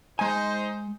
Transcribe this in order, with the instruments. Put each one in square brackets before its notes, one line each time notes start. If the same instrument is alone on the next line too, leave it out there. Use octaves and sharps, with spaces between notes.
[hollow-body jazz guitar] G#3 G#5 [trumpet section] D#4 C5